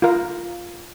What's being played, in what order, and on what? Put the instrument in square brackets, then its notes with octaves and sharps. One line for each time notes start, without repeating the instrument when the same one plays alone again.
[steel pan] F4 A#4 F5